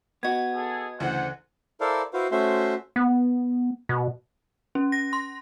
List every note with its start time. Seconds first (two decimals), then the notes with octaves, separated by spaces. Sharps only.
0.23 B3 F#4 D#5 G#6
0.55 G#4 A4
1.00 D2 C#3 E3 C5 F#5
1.81 E4 A4 A#4 C5 D5 F5
2.13 E4 F#4 B4 C5 F5
2.31 A3 C#4 F#4 C5 E5 C6
2.96 B3
3.89 B2
4.75 C#4
4.92 A#6
5.13 C6